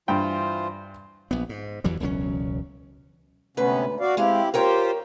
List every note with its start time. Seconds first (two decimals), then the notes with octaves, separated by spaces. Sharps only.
0.08 G2 E3 F4 C5 G5
1.31 A#1 B3
1.49 G#2
1.84 E2 E3 F#3 G3
2.00 E1 C#2 F#3 C#4
3.57 D2 G#2 C3 B3 C#4 B4
4.00 F#4 D5 F5
4.17 G#3 C4 E4 G4 F5
4.54 F4 G4 A#4 C5 C#5 G5